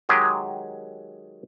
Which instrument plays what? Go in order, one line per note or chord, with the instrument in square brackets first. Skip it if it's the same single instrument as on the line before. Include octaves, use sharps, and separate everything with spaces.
[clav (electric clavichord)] D#3 F#3 G#3 G4 G#4 D#5